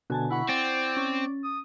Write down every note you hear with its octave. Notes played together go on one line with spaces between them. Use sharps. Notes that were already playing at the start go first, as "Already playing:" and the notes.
B2 D3 F#4 G#5 A5
E4 F#5 B5 C#6
C4 D5 A6
C#4
D#6